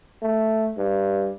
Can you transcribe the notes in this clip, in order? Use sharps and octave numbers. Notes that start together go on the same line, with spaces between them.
A3
G2